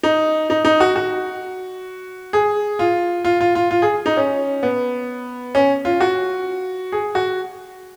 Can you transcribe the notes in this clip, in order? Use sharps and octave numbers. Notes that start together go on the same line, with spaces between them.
D#4
D#4
D#4
F#4
F#4
G#4
F4
F4
F4
F4
F4
G#4
D#4
C#4
B3
C#4
F4
F#4
G#4
F#4